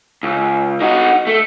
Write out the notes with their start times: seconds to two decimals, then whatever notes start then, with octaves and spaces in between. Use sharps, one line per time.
0.23 C#2
0.81 D#4 F#4
1.27 A3